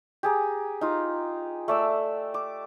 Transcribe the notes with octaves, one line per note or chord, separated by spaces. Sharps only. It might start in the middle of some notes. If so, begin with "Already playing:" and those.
G4 G#4 A#5
D#4 F4
A3 D5 E6
D6